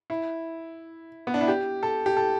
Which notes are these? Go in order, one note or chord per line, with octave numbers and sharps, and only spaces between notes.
E4
B3
D4
E4
G4
A4
G4
A4